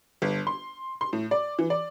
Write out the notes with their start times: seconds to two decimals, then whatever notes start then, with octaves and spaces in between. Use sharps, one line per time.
0.22 G1
0.47 C6
1.01 C6
1.13 A2
1.31 D5
1.59 E3
1.70 D5